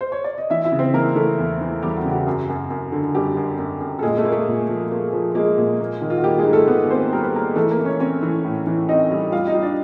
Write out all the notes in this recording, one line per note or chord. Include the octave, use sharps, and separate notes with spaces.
C5
C#5
D5
D#5
E3 E4 E5
E4 E5
C#3
C4 C5
E3 A#3 A#4
E3 A3 A4
E2
E3
E2 G3 G4
F#4
C#3
F#4
F#2
F#2
F#2
D3
F#2 G3 G4
F#2
F#2
F#2
A4
A#2 G#3 G#4
A3 A4
A#3
A3 A4
A#2
F3
A#3
F3
G#3 A#3 G#4
A#2
A#3
D#3
F4
F#4
G3 A#3 G4
G#3 G#4
G#2
A3 A4
D#3 B3 B4
A#3 C4 C5
G3 A#4
B4
A#3 A#4
E3 A3 A4
A#3 A#4
E3
C#4 C#5
C4 C#4 C#5
E3
A2
E3
C4 D#4 D#5
G3
G3 F4 F5
D#4 D#5
G3
D4 D5